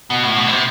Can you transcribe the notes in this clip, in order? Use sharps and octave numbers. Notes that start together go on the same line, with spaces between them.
B2
A2
B2
D3
C3